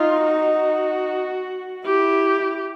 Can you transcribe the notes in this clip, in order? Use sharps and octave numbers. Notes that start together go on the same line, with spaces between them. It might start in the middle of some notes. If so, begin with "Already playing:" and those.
Already playing: D#4 F4
F#4
E4 G4